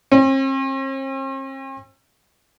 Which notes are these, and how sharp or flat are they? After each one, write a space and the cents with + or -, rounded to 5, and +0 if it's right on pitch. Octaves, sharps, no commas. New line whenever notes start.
C4 +45